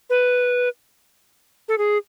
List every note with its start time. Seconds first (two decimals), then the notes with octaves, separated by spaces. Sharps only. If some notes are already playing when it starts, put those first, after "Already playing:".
0.10 B4
1.68 A4
1.78 G#4